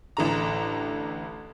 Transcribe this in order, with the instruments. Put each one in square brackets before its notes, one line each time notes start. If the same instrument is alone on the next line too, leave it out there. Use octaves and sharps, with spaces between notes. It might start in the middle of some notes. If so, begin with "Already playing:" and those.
[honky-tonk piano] A1 D3 A#5